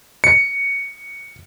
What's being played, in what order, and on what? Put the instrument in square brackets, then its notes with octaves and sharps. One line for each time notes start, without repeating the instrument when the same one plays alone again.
[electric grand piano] C#7